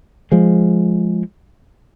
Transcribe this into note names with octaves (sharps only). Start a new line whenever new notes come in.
F3 G#3